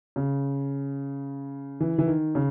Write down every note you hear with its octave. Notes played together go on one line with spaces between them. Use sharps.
C#3
E3
E3
D#3
C#3